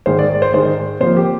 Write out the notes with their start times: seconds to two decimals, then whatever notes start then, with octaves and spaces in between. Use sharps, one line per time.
0.06 G#2 D#3 G#3 C5
0.19 D5
0.30 D5
0.42 C5
0.53 G#2 D#3 G#3 C5
1.00 C3 F3 A#3 C5
1.17 G4